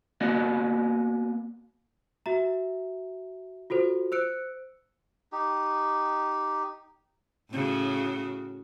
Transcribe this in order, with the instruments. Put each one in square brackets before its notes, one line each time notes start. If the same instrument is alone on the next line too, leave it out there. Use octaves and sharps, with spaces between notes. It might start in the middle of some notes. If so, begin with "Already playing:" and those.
[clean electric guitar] A#3 B3 F#4 D5 D#5
[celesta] F#4 E5 A#5
F4 F#4 A4 C5
C5 E6 F#6 C#7 D7
[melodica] D#4 G4
[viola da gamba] A2 C#3 F#4